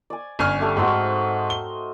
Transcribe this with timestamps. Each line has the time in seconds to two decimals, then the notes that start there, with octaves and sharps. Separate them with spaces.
0.10 D5 G#5
0.39 G1 C#4 G#5 F6
0.60 G3 A3 D5
0.77 G#2 C4 D#4 F#4
1.50 G7